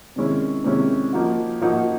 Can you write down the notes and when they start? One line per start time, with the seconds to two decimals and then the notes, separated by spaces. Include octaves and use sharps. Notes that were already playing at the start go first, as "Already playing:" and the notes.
0.16 C3 D#3 G#3 C#4 E4
0.64 C3 D#3 G#3 C#4 E4
1.13 F3 A#3 D#4 F#4
1.61 F3 A#3 D#4 F#4